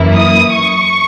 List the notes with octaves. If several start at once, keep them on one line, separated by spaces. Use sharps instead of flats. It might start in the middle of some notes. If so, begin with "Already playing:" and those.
Already playing: F#2 E3 A#3 E4
D#6
C#6